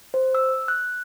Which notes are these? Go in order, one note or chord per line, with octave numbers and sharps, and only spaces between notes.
C5
E6
F#6